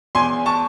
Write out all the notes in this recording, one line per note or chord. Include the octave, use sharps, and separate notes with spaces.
E2 G#5 C6
A5 C#6